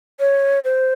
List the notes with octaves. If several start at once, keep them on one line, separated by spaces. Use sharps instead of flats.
C#5
C5